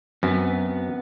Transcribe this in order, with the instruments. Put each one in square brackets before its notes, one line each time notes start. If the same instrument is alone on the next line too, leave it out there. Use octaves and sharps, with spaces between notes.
[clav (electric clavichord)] F#2 [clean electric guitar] B3 C4 B4